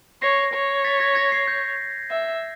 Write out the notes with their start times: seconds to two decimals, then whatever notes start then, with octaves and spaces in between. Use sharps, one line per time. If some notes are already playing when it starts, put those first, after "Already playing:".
0.22 C#5 A#6 C7
0.54 C#5
0.84 A6 B6
1.00 G#6 A#6
1.15 G#6 A#6
1.32 A#6 C7
1.48 G6
2.10 E5